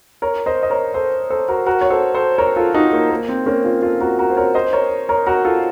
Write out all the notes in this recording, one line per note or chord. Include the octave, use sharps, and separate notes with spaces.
A#4 C#5
C5 D#5
D#5
A#4 C#5
A4 C5
A4 C5
F#4 A#4
F#4 A#4
C#5
A4 C5
A4 C5
A#4 C#5
F4 A4
D#4 F#4
A#3
A#3
C4
A#3 C#4
C#4 F4
F4 A4
F#4 A#4
F#4 A#4
C5
A#4 C#5
C5 D#5
A#4 C#5
A#4 C#5
F#4 A#4
F4 A4